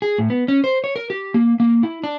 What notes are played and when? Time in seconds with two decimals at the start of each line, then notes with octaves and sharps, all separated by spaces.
0.02 G#4
0.18 A2
0.30 B3
0.48 C#4
0.64 C5
0.84 C#5
0.96 A#4
1.10 G4
1.34 A#3
1.60 A#3
1.83 E4
2.04 D4